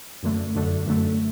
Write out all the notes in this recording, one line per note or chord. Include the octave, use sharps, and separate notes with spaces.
F#2 D3 A3
F#2 D3 A3
F#2 D3 A3